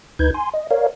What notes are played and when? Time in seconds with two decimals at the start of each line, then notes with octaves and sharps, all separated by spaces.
0.19 D2 D#4 B4 G6 G#6
0.34 G#5 C6
0.54 D#5
0.71 A#4 C#5 D5 F5